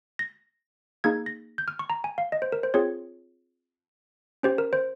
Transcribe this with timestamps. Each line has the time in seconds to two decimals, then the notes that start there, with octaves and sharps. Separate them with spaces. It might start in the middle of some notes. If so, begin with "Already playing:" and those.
0.19 A#6
1.04 A#3 D#4 G#4 G#6
1.26 A#6
1.58 G6
1.68 F6
1.79 C#6
1.90 A#5
2.04 G#5
2.18 F5
2.32 D#5
2.42 C5
2.52 A#4
2.63 C5
2.74 C4 F4 G#4 C#5
4.43 C#4 G4 C5
4.58 A#4
4.73 C5